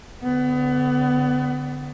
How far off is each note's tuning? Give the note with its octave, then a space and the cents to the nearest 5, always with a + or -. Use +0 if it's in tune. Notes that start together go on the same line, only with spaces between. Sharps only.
D3 -15 B3 +30